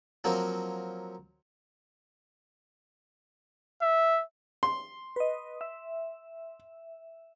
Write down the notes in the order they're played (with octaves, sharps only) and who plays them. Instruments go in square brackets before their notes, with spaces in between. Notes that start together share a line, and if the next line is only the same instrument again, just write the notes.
[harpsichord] F3 F#3 A#3 C4
[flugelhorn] E5
[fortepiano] C6
[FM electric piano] B4 D#5
E5